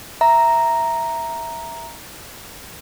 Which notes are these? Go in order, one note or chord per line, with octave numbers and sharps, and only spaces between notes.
E5 A#5